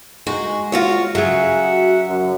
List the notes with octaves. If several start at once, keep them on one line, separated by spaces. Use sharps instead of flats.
G#3 D#4 F#4
F4 F#4 C#5
C#3 F#3 G#4 E5 F#5
F#4
F#2